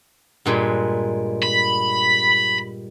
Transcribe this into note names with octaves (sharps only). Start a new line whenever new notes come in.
G2 A#2 G#3
B5